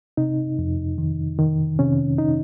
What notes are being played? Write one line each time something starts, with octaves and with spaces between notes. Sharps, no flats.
C3 D#4
F2
D#3
D#3
C3 C#4
D#4